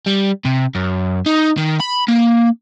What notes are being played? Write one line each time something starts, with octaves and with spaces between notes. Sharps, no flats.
G3
C3
F#2
D#4
D#3
B5
A#3